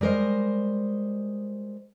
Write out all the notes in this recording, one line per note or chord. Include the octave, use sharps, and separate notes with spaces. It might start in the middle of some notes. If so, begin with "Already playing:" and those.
G3 G#3 A#4 C5 D#5